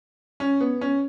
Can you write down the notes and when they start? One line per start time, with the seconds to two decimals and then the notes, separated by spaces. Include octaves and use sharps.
0.40 C#4
0.61 B3
0.81 C#4